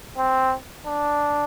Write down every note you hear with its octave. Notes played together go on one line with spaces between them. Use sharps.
C4
D4